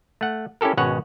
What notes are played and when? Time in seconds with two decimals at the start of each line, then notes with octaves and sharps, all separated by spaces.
0.21 A3 F#5
0.61 C#4 E4 G4 A4 A#4
0.77 G#1 B2 G#3 C#4 C#5 F#5